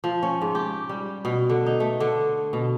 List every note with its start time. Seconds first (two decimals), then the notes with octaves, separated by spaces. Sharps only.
0.04 F3
0.23 C#4
0.41 G#2
0.55 G4
0.89 G3
1.25 B2
1.50 D3
1.66 D#4
1.80 A3
2.00 D3
2.53 B2